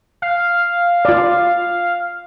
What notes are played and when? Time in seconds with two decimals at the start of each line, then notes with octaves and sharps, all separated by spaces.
0.22 F5
1.05 F4 D5